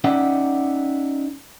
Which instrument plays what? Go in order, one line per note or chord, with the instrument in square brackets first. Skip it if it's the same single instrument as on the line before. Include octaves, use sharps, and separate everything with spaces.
[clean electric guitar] C#4 D#4 D5 E5 F#5 G5